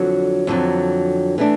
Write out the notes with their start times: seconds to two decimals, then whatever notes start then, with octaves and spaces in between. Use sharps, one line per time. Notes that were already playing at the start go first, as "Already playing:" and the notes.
Already playing: F2 D3 F#3
0.47 F2 D3 F#3
1.38 E3 A3 D4